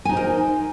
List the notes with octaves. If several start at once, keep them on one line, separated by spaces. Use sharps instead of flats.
D#4 A#4 C5 G#5